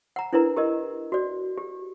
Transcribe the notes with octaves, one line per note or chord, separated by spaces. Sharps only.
F#5 A#5
D4 E4 A#4 B4 A#5
G4 A#4 D#5
F#4 D5
G4